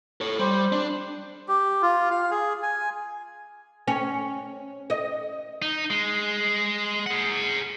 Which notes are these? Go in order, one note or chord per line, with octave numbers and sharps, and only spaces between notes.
A4 C#5
G3 C5
D4
G4
F4
F5
G#4
G#5
C#4
D#5
D#4
G#3
G#4 F#5